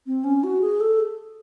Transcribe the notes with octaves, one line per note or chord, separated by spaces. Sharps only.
C4
C#4
F#4
G#4
A4